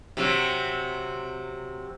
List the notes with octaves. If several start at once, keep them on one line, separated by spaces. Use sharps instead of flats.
C3 F#3